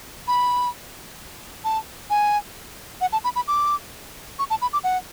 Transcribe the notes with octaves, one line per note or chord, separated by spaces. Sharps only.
B5
A5
G#5
F#5
A5
B5
B5
D6
C#6
A5
B5
D6
F#5